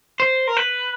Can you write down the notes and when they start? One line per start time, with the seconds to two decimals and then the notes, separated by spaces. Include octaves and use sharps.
0.20 C5
0.47 A#4
0.57 B4